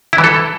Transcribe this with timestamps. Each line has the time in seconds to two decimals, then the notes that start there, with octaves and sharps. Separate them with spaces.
0.13 E4
0.18 E3
0.24 A4